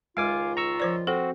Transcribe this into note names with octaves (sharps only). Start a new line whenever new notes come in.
C#2 D#3 G#3 F4 F5 G#5 D6
A#5 C#6 E6
F3 C5 D5
C4 F#4 A4